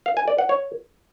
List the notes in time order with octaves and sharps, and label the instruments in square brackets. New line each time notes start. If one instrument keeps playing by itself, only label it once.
[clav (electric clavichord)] F5
G#5
D5
F#5
C#5